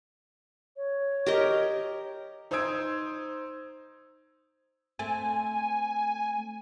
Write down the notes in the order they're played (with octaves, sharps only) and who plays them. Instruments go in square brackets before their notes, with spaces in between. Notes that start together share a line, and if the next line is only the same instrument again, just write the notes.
[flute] C#5
[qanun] G4 A#4 D#5
[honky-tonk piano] D#4 C5 D#6 E6 G#6 D7
[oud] A3 C4 [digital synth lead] G#5